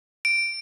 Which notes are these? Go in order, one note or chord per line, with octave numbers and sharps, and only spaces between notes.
D7